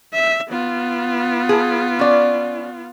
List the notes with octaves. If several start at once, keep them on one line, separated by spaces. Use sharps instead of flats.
E5
B3 F4
G#4
C#4 D5